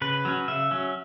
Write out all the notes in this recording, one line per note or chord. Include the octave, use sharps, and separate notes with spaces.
C#3 B4
F#3 C#4
C#3 E5
F#3 C#4